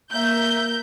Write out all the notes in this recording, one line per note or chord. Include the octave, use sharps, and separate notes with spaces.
A#3 A#4 E5 G6